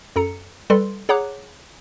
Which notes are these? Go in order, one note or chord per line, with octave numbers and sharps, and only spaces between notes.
F#2 A4 A#5 C#7
G3 A4 B4 D5 C6
G#4 C#5 F#5 A#5 D6 F#6